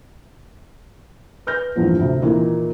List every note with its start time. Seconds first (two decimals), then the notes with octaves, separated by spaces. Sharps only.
1.47 B4 F6 G6 A#6
1.76 E2 G2 A#2 E3 F3
1.99 D2 C3
2.22 A#2 D#3 E3 A#3